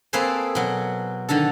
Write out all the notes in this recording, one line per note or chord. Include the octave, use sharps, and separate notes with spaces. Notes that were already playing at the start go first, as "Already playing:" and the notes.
A#3 C4 G#4 A4 B4 C5
B2 F#3
D3 D#3 D4 A4